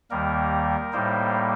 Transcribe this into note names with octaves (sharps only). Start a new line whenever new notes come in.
D#2 D#3 G3 A#3 A#4
A2 G3 A#3 D#4 C5